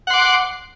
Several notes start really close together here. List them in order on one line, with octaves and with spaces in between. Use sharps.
F#5 C6 D6